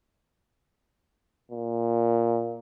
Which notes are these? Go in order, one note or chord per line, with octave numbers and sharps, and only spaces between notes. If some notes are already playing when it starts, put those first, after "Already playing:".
A#2